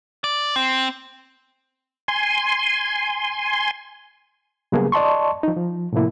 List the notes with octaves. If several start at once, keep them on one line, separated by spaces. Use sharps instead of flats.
D5
C4
G#5 C6
C#3 F#3 G3 A#3 B3 G#4
D5 D#5 A5 C6 C#6
F3 D#4
F3
A2 C3 F3 A#3 E4